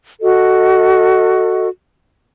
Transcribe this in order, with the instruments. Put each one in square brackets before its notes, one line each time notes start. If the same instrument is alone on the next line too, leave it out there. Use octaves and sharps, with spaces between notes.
[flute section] F#4 A4 D#5